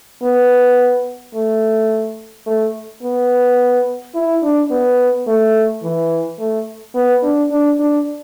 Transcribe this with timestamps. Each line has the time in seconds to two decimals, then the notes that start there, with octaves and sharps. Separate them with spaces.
0.23 B3
1.35 A3
2.46 A3
3.03 B3
4.15 E4
4.43 D4
4.71 B3
5.27 A3
5.83 E3
6.39 A3
6.95 B3
7.23 D4
7.51 D4
7.80 D4